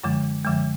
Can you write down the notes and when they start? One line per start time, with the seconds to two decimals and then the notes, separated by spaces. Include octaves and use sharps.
0.04 F#2 D3 F3 G#3
0.44 F#2 D3 F3 G#3